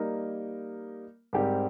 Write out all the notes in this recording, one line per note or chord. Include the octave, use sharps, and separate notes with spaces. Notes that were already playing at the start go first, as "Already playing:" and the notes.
Already playing: G3 A#3 D#4 A#4
G#2 G3 C4 G4 A#4